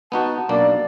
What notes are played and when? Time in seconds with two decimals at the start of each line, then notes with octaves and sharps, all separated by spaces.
0.12 B3 D#4 F#4 A5
0.49 B1 A#3 D4 D5